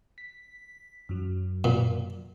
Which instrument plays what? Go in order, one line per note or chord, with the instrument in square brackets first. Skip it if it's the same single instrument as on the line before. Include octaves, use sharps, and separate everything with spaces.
[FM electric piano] B6
F#2 F#3
[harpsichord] A#2